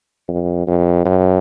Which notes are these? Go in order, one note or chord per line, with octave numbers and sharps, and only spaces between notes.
F2
F2
F#2